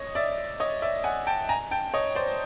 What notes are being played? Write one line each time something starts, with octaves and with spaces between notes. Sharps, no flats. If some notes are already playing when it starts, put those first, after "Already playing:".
Already playing: C#5 D#5
D5 E5
C#5 D#5
D5 E5
F#5 G#5
G5 A5
G#5 A#5
G5 A5
C#5 D#5
C5 D5